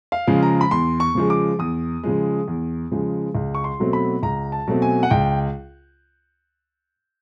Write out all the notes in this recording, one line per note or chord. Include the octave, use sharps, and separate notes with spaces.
F5
C#3 F3 G#3
A#5
B5
E2 C6
C#6
C#3 F3 G#3
D6
E2 D#6
C#3 F3 G#3
E2
C#3 F3 G#3
C#2
C#6
C6
B2 F#3 A3 C4
B5
C#2 A#5
A5
B2 F#3 A3 C4
G#5
F#5
C#2 G5